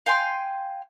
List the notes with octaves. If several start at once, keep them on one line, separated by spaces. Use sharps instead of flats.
F5 G5 G#5 C6